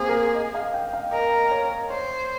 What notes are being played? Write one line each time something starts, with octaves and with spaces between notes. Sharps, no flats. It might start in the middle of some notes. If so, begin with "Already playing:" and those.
Already playing: A#3 C4 G#4
A#4
D#5
F5
G5
F5
A#4 D#5
C#5
C5 C#5